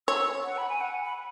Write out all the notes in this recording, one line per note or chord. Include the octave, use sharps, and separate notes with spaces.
C#5 E6
F#5
B5
G#5
F#5
B5